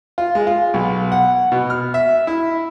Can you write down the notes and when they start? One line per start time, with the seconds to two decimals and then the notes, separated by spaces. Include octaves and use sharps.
0.18 F4
0.35 G#3
0.47 F4
0.74 B1
1.12 F#5
1.52 B2
1.70 F6
1.94 E5
2.27 E4